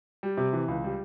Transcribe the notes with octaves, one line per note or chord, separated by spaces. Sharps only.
G3
C3
E3
C#2
G3